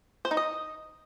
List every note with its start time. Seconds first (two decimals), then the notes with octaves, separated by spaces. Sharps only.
0.25 C5
0.31 D#4
0.37 D#5